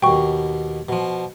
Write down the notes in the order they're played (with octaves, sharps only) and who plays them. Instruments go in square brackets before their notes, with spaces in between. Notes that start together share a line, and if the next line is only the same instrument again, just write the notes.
[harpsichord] D#2 B2 [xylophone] G5 C#6
[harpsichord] B2 F3